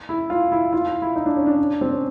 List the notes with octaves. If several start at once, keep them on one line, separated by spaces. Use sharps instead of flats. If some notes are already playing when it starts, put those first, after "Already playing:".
E4
F4
E4
F4
F4
E4
D#4
D4
C#4
D4
C4
C#4